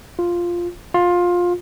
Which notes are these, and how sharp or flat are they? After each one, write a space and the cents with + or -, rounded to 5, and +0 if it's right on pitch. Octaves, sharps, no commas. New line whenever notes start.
F4 -5
F4 +15